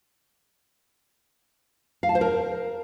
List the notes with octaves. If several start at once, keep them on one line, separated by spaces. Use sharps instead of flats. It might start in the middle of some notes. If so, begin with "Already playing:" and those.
F5
A5
C5
A#4